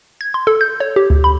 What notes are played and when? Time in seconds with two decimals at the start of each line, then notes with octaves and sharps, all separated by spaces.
0.21 G#6
0.34 C6
0.47 A4
0.61 G6
0.80 C#5
0.96 G4
1.10 D2
1.24 B5